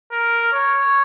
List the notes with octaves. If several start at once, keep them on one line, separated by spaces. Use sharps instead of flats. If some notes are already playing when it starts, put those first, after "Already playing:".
A#4
C#5